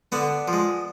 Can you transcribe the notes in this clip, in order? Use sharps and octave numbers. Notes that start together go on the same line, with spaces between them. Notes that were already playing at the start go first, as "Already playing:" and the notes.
D3 B3 D4
F3
G#3